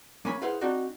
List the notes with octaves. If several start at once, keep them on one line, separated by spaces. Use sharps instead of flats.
A#3 C#4 G#5 B5
E4 G#4 B4 C5 F5 F#5
C4 D4 D#4 F#4